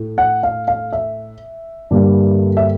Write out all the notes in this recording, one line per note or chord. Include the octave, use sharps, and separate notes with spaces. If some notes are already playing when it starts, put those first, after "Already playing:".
Already playing: A2 A3
F#5
F5
F5
E5
G2 D3 G3 A#3
E5